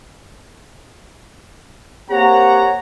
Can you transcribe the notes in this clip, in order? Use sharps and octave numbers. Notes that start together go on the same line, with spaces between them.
A#3 C4 G4 C#5 F#5 A#5